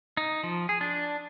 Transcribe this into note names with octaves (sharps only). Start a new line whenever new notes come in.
D#4
F3
G#4
D4